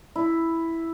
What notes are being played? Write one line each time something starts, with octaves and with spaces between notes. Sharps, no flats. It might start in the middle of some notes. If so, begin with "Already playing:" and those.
E4